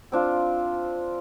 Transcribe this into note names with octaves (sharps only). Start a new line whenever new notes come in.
C4 D4 F4